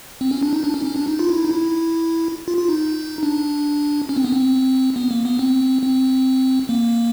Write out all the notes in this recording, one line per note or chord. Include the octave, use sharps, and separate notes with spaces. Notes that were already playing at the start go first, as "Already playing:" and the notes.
C4
C#4
D4
D#4
D4
C#4
C#4
D4
D#4
F4
E4
D#4
E4
F4
F4
D#4
D4
C#4
C4
B3
C4
B3
A#3
B3
C4
C4
A#3